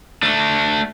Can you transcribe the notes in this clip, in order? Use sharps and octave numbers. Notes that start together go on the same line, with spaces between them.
A3 D4